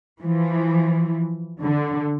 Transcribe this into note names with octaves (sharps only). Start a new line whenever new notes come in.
E3 F3
D3